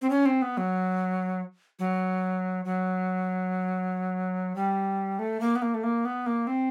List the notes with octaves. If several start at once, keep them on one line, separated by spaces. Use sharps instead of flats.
C4
C#4
C4
B3
F#3
F#3
F#3
G3
A3
A#3
B3
A#3
A3
A#3
B3
A#3
C4